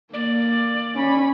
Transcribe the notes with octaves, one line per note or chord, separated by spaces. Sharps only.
A#3 D5
C#4 B5